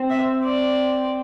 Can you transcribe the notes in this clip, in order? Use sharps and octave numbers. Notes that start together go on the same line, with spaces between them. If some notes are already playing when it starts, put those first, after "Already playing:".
Already playing: C4
E5
D5